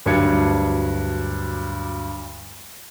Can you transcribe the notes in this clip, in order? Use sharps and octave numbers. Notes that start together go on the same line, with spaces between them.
D2 G2 F#3 D4 G#6 C#7